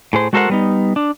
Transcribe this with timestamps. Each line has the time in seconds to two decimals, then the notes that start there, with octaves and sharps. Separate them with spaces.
0.13 A2 G#4 C5
0.33 G#3 F#4 A4 A#4 C5 F#5
0.50 G3 B3 D#4
0.96 D4